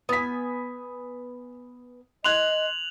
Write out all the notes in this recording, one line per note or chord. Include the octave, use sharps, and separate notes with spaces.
B3 G#5 D#6 B6
D#5 C6 F#6 G#6 F7 F#7